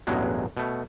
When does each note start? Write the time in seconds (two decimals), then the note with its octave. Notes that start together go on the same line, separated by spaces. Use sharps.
0.07 A1 E2 G2 B2 F#3 G#3
0.57 B2 A3